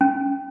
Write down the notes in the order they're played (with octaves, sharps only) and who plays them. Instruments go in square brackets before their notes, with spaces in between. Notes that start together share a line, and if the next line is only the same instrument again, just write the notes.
[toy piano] C#4